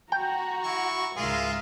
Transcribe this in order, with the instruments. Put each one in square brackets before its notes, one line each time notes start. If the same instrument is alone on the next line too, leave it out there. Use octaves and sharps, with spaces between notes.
[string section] F#4 [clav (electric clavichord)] G5 [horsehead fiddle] A#5
[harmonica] E4 C#6
[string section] C#2 G#2 F5 [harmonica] G#3 F4 G#4 [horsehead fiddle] A#4 E5